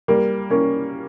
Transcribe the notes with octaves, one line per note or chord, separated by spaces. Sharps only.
G3 A#3
A#3 C#4